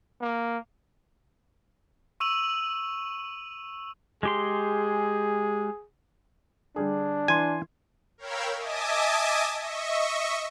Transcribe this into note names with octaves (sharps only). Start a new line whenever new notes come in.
A#3
C#6 E6 D#7 F7 F#7
G#3 G4 G#4 C6
D3 G3 D4 G#4
E3 G#5 C6
A#4 C#5 F5 G5 B5 E6
D#5 E5 G#5 A5 D6 D#6
D#5 E5 C#6